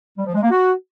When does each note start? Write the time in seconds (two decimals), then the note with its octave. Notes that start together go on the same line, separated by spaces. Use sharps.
0.17 G3
0.26 F3
0.34 G#3
0.42 A#3
0.51 F#4